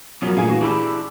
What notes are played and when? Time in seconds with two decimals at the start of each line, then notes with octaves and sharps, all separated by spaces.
0.22 F#2 B2 F3 F#3 A#3 C#4
0.37 A#2 A3 G#4 F5 G#5
0.50 E3 F#4
0.61 D4 E4 G4 G#4 B5 E6